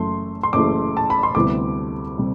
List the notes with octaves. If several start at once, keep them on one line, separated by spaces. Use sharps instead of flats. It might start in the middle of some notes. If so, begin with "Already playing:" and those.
Already playing: F#1 F#2 E3 A3 C6
C6
F#1 F#2 E3 A3 D6
A5
B5
C6
D2 C3 G3 B3 E4 D6
C3 G3